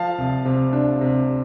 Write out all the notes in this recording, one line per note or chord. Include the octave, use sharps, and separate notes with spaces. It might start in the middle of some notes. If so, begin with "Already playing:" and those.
Already playing: F3 F5 A5
C2
C3
D4
C3